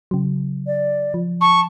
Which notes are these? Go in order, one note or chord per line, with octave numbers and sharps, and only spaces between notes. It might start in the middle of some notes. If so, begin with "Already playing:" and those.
C#3 F#3
D5
F3
A5 C#6